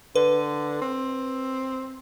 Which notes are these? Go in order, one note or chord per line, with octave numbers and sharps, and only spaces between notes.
D3 B4
C4